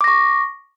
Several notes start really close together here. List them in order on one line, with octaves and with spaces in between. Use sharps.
D6 A#6 C#6